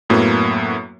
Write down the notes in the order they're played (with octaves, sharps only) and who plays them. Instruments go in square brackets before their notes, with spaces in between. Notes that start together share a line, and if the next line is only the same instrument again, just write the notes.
[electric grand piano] F#2 A2 F#3 A#3 B3